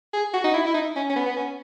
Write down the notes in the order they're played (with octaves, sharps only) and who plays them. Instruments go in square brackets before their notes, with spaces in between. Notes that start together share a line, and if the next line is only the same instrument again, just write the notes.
[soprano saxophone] G#4
F#4
D#4
E4
E4
D#4
C#4
C#4
B3
B3
C#4